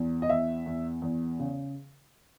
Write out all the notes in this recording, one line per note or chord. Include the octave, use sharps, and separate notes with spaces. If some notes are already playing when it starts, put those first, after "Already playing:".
Already playing: E2
D#5
E2 E5
E2
E2
C#3